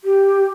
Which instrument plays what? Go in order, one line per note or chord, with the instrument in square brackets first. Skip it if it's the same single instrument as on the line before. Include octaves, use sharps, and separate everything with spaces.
[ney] G4